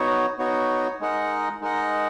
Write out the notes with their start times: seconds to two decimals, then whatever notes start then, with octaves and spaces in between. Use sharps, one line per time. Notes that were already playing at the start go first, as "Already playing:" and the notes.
Already playing: B3 D#4 F#4 C#5
0.39 B3 D#4 F#4 C#5
1.00 G#3 D#4 A#4 D#5 F#5
1.61 G#3 D#4 A#4 D#5 F#5